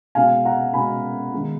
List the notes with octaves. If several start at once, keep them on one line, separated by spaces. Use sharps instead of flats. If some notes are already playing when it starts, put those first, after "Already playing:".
B2 G#3 B3 F5 G#5
F#5 A#5
B2 G#3 B3 G#5 B5
D#3 G#3 B3 D#4